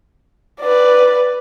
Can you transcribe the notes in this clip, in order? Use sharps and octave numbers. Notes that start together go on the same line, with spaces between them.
B4 D5